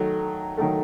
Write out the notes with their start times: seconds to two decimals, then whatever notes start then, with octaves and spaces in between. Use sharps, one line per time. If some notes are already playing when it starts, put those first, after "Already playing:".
Already playing: D#3 F#3 A3
0.57 D#3 F#3 A3